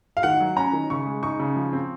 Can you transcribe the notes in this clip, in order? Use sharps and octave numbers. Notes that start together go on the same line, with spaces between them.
F5
D#3 F#5
F#3
C#4 A#5
D#3
C#3 C#6
G#3
D#4 C#6
C#3
F3
C4